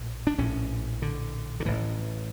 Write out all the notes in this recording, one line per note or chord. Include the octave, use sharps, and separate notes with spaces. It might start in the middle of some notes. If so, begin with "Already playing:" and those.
Already playing: A#1 A2
D4
A#1 A2 C#4
D3
D3
A1 A2 E3